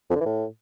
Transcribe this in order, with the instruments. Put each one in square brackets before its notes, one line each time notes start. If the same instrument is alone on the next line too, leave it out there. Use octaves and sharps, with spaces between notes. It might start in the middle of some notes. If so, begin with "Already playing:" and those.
[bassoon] F2
D3
E3
A2